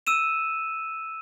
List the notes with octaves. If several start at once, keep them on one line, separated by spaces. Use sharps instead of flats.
E6 D#7 E7